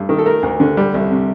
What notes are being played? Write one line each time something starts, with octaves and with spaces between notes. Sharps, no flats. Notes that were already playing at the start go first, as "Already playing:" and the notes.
Already playing: G2 A3
D#3
A4
A3 A#4
D2
D3
G3
C2
C3